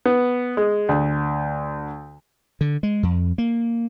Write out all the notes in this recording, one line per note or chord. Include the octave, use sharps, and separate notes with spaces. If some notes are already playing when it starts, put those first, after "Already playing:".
B3
G#3
D2
D3
G#3
F2
A#3